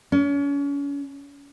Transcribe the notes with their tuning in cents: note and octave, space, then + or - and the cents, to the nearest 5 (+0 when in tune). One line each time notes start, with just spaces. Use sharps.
C#4 +35